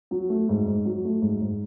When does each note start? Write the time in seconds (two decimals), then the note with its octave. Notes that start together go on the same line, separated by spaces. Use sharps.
0.11 F#3
0.29 A3
0.49 G#2
0.67 G#2
0.85 F#3
1.05 A3
1.22 G#2
1.41 G#2